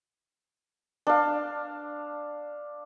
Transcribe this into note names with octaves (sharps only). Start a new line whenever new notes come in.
D4 F5